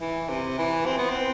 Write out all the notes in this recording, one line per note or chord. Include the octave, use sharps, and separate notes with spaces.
E3
C3
E3
C4
B3
C4